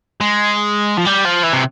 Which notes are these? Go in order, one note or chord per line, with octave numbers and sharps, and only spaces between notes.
G#3
F3
G3
F3
E3
C3